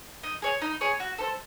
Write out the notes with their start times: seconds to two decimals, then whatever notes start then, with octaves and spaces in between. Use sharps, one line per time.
0.23 D#4
0.42 G#4 C#5
0.61 D#4
0.81 G#4 C#5
1.00 F#4
1.18 A4 C5